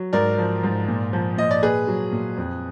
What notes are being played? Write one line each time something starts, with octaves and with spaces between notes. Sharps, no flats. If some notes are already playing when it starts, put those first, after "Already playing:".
Already playing: F#3
G#2 A#4 D5
F3
G#2
A#2
F3
A#2 D#5
D5
A#2 G#4 B4
F#3
A#2
F2